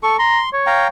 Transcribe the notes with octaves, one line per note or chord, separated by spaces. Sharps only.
A4 C#6
A#5 C6
C#5
F5 G5 A#5